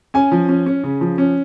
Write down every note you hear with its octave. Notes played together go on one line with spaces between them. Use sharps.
C#4 G#5
F3
C#4
C#4
C#3
F3
C#4